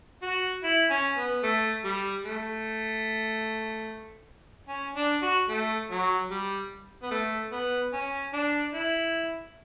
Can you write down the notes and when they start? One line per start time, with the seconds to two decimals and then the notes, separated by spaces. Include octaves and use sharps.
0.22 F#4
0.63 E4
0.90 C#4
1.17 B3
1.43 A3
1.84 G3
2.24 A3
4.68 C#4
4.96 D4
5.22 F#4
5.49 A3
5.90 F#3
6.30 G3
7.02 B3
7.11 A3
7.52 B3
7.93 C#4
8.33 D4
8.73 E4